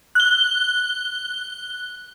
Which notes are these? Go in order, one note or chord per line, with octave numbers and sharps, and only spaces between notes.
F#6 G7